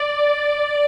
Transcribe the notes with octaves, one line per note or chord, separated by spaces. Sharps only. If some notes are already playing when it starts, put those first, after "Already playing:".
Already playing: D5